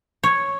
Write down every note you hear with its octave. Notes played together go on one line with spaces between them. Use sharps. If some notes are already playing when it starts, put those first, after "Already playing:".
C#5